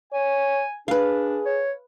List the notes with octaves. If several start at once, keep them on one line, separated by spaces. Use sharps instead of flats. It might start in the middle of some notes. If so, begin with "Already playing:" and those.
C#5 G#5
D4 G#4 B4 F5
C#5